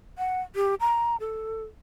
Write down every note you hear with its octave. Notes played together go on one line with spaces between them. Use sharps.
F#5
G4
A#5
A4